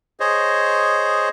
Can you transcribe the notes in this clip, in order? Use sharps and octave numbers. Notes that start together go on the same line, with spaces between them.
G#4 C5 C#5 D#5